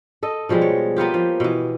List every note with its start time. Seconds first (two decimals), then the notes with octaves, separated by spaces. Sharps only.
0.23 A4 D#5
0.49 B2 F3 G3 G#3
0.62 C#5
0.96 A#3 B3 F4 G4
1.14 F3
1.40 B2 E3